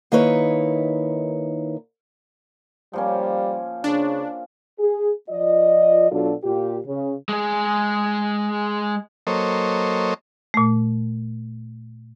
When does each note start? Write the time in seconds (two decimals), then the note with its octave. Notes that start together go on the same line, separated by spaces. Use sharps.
0.12 D#3 A#3 D#4 E4 B4 C#5
2.93 F3 G3 A#3 C#4
3.84 C#3 D4
4.80 G#4
5.30 F3 F4 D5 D#5
6.11 B2 F#3 D4 F4 A4
6.44 A#2 F4 G4
6.86 C#3
7.29 G#3 G#4
9.27 F#3 A#3 A4 C5 C#5 D#5
10.54 A#2 A3